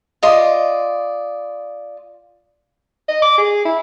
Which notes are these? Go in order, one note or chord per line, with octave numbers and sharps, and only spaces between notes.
F4 D5 D#5 C6
D#5
D6
G#4
E4